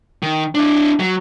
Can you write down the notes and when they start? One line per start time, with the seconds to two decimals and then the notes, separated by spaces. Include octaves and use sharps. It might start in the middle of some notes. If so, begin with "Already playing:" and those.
0.23 D#3
0.55 D4 E4
1.00 F#3